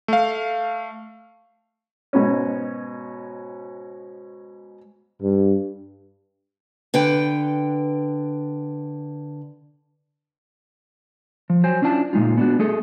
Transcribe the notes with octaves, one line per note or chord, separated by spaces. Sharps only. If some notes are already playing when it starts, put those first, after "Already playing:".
A3 F5
G#2 B2 C#4
G2
D3 B4 G5
F3
F#3 C5 G5 G#5
C#4 D4 E4 F4 A5
A#2 C#3 G#3 D#4 F4
B3 D4 F#4
A3 G#4 A4